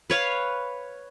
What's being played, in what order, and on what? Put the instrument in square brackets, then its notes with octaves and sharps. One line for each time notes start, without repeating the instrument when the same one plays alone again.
[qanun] B4 C#5 F5